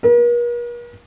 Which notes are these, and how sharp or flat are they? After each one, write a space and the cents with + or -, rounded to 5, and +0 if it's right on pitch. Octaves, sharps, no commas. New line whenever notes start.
A#4 +45